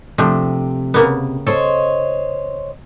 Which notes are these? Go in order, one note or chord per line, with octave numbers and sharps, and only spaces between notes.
C3 F3 A3 D4
C#3 A#3 B3
A4 C5 C#5 D#5